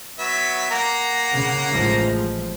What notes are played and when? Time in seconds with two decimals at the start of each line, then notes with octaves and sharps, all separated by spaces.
0.18 F#3 B3 E5
0.71 A#3 F#5 A#5
1.35 C#3
1.72 A1 F3 G#3